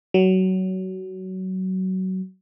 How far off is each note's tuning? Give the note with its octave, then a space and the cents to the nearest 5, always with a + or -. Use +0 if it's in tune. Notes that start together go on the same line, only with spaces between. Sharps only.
F#3 +20